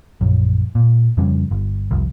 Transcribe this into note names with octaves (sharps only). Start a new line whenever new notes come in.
A#1 F#2
A#2
F2 C#3 G3 C#4
G1
F1 C2